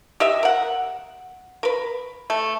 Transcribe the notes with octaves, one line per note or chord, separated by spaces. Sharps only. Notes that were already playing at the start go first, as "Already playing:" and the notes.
G4 D#5 E5
A#4 F#5
A#4 B4
A3